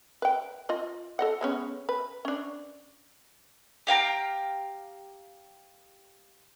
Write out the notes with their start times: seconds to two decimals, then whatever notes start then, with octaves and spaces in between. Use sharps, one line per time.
0.22 B4 G5
0.69 F4 D#5
1.19 A4 D#5 F#5
1.41 G#3 B3 C#4
1.89 B4
2.25 C#4 D4
3.87 G4 F5 G5 A#5